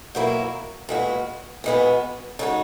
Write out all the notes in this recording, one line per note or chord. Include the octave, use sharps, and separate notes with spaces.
B2 F#3 A#3 E4
A#2 G#3 B3 F#4
A#2 G#3 B3 F#4
C#3 G#3 D#4 F#4